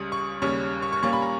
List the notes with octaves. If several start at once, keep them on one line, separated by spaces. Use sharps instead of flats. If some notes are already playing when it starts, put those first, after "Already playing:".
Already playing: C#2 C#3 G3 D#6
C#6
D#2 C#3 G3 C#4 C#6
C#6
C#6
A#2 G3 A#3 C#4 C#6
B5
A#5